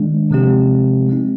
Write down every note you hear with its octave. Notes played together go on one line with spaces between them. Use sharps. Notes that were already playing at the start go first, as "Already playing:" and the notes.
Already playing: D#3 G#3 D4
C3 F3 G#3 C4 G4
G#3 C4 D#4